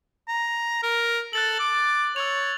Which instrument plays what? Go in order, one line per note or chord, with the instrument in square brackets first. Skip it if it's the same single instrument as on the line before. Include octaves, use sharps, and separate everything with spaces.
[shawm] A#5
A#4
[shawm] A4 [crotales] F#6 A6 F#7
[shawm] D6
[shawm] C#5 [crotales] E6 F7